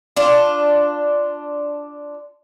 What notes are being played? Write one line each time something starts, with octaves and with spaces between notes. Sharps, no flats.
D4 F4